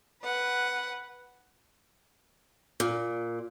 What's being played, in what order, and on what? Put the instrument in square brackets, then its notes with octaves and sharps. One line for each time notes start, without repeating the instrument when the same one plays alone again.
[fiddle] B4 F#5
[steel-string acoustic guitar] A#2